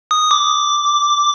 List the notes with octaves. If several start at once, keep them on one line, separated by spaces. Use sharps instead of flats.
D#6
D6